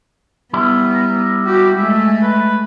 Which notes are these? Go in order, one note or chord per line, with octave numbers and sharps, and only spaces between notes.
G3 B3 E4
A#5
F#4 G4
G#3 A3 E5
B4